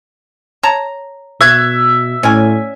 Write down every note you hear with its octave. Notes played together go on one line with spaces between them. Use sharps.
C#5 A5 A#5
B2 E5 C#6 F#6 G#6
A2 C#4 D5 G#5